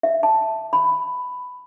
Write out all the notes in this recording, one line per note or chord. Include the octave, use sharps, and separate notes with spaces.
E5
A5
B5